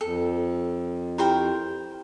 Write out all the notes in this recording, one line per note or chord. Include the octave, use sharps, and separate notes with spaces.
F2 A4
E4 G4 A#4 C5 G5 B5